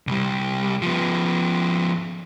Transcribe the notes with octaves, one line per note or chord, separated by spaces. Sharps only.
C2 G3
F3 B3